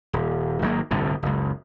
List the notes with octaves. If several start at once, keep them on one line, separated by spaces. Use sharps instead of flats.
D#1
G#1 D#3 F#3 A#3
G1 C2 A2 D3
F#1 C#2